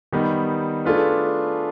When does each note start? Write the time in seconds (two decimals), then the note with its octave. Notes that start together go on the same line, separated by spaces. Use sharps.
0.13 D#3 G3 B3 D#4
0.85 A3 D4 F4 G#4 B4